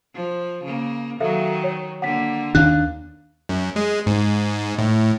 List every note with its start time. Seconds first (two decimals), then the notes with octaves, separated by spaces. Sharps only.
0.14 F3
0.64 C#3 A#3
1.20 D#3 F#3 A4 E5 F5
1.64 C#5
2.02 D3 A#3 F#5 B6
2.55 D#2 D#3 D4 F5 F#6
3.49 F#2
3.76 G#3
4.06 G#2
4.78 A2